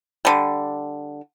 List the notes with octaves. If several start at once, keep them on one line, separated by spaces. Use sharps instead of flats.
D3 G3